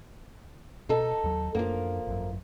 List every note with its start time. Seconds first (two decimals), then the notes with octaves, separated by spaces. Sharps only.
0.89 B2 D#4 A4
1.24 D#2 F#3
1.55 F#2 F3 A#3 B3 D4
2.07 G#1 F#2